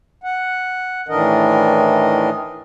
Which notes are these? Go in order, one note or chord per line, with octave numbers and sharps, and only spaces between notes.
F#5
A2 D#3 E3 D4 A#4 D#5